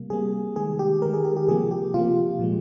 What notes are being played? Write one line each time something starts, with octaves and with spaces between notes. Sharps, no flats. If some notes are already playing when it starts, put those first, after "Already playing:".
Already playing: C3 G3 A#3
C3 G3 A#3 G#4
D#3 G#3 G#4
G4
D#3 G#3 A#4
G#4
G4
G4
C3 F3 A#3 G#4
G4
C3 F3 A#3 F4
A#2 F3 G#3